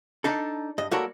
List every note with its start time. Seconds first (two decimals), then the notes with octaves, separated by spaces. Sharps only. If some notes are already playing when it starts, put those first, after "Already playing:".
0.24 D4 D#4 A4
0.78 G2 D#5
0.91 G3 A#3 F#4 A4 A#4 C#5